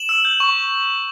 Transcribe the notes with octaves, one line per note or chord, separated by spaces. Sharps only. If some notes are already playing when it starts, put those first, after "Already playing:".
Already playing: E7 F#7
E6
G6
C#6